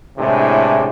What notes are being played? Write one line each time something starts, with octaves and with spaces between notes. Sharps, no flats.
A1 A2 C3 G#3 D4